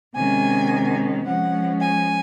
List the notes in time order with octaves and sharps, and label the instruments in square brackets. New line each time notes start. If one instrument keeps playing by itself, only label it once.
[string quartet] C3 D#3 G#3 C#4 G#5
F3 G#3 C#4 F#5
G#5